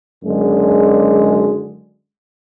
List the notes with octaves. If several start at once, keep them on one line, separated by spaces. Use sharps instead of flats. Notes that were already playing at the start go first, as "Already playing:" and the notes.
F#1 F#2 D3 G#3